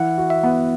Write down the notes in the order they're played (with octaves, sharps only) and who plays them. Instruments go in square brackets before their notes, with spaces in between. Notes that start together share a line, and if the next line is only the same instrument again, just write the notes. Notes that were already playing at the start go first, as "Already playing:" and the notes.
Already playing: [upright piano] E3 [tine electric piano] F#5
[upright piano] F#4
[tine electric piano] E5
[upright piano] B3